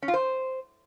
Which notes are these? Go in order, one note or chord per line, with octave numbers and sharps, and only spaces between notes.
C#4
F4
C5